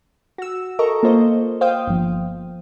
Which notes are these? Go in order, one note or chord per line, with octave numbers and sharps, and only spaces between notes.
F#4 E6
A4 A#4 D#5 A#5 C#6
A#3 F4 C5 D#5
C5 F5 G5 D#6
G1 F3